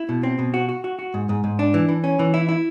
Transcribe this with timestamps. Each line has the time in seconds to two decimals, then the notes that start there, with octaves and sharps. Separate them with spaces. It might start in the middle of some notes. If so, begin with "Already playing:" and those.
Already playing: E4
0.09 B2
0.23 C4
0.39 B2
0.54 F#4
0.69 F#4
0.84 F#4
0.99 F#4
1.14 G#2
1.29 G#2
1.44 G#2
1.59 D4
1.74 E3
1.89 E3
2.04 C#4
2.19 E3
2.34 E4
2.49 E4